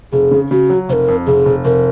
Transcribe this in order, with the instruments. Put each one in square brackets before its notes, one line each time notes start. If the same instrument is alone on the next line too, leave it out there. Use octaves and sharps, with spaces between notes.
[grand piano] F1 [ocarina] G#4
[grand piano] C#3
[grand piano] C#3 [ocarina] F#4
[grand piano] F#3
[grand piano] F1 [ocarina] C5
[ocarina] A#4
[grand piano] F2
[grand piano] F1 [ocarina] G#4
[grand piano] F1
[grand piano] F1 [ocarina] A#4